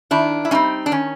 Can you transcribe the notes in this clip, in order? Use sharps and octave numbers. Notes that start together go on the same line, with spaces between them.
D#3 D4 E4
E4
G3 C4 C#4 D#4
D4
D#3 C#4